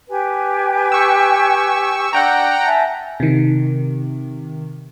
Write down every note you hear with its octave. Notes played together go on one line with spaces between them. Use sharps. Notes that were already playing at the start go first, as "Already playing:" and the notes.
G4 B4 G#5
C#6 E6
D4 F#5 G5 A#5
E5 G#5 A5
C3 D#3